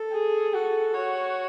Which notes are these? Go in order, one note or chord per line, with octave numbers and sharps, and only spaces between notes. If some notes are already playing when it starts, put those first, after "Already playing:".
Already playing: A4
G#4
F#4 A4
F#4 C#5